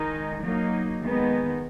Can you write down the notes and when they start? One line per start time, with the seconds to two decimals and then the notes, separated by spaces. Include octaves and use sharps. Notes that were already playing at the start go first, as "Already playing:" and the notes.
Already playing: D#3 G#3 D#4
0.43 F#3 A#3 D#4
1.02 D#3 G#3 B3 D#4